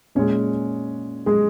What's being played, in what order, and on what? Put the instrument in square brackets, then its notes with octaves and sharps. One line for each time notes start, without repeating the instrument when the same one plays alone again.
[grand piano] A#2 G#3 C#4 C#5
G#3 G#4